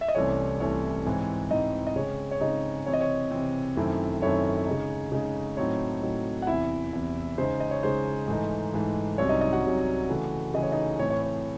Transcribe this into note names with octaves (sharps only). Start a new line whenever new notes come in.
E5
D#5
C2 C3 E3 A3 C#4 C#5
C2 C3 E3 A3 C#4 C#5
G#2 E3 C4
G#2 E3 C4 D#4 D#5
D#5
C#3 G#3 C4 C#5
C#5
C#3 G#3 C4 D#4 D#5
C3 E3 C4 C#5
D#5
C#5
C3 E3 C4
F#2 D#3 A3 C4 E4
F#2 D#3 A3 C4 E4 C#5
C#3 G#3 D#4
C#3 G#3 D#4
A2 F#3 C4 D#4 C#5
A2 F#3 C4 D#4
F#5
E2 C3 E3 E4 E5
E2 C3 E3
C#3 G#3 D#4 C5
D#5
C#5
C#3 G#3 D#4 C5
G#2 E3 A3 D#4
G#2 E3 A3 D#4
C2 C3 F#3 C#4 C#5
D#4 D#5
D#4 D#5
F#4 F#5
C2 C3 F#3 C#4
C#3 E3 A3
C#3 E3 A3 D#5
C#5
D#4 D#5
A2 E3 C4 C#5
C#5
C#5